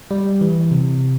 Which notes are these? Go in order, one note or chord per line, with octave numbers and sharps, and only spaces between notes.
G3
E3
C3